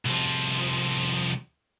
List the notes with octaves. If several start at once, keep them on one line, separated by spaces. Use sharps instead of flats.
C2 F3